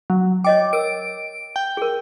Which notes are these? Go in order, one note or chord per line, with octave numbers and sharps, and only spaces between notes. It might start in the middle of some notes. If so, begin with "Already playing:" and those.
F#3
C#5 D#5 G5 D6
A#4 E6 D7
G5
G#4 A#4